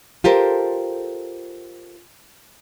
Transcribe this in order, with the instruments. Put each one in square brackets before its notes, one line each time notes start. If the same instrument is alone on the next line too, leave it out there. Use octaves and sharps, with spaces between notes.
[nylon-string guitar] F4 G4 A4 A#4 C5